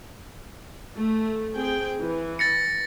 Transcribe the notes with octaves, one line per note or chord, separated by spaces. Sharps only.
A3
C4 G#4 G5
E3
A6 A#6 C#7